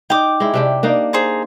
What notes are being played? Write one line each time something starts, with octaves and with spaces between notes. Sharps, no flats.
D#4 G5 D6
G#3 E4
C3 D4 G4
A#3 D4 D#4
G#4 C5 A#5